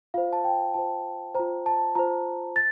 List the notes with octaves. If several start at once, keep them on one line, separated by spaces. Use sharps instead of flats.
F4 C5 F5
A5
G5
F4 C5 A5
F4 C5 A#5
A5
F4 C5 A#5
A6